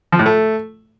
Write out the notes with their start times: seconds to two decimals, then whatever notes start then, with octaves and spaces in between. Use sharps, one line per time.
0.12 F3
0.19 A2
0.26 A3